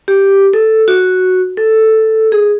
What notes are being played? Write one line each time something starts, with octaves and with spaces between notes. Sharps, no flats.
G4
A4
F#4
A4
G#4